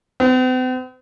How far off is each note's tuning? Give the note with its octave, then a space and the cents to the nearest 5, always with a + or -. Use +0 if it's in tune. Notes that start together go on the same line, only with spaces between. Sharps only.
C4 -45